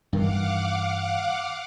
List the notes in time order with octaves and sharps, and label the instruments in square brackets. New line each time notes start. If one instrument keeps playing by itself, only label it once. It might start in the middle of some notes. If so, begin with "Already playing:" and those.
[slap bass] G2 D#3 E3 [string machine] F5 F#5 D6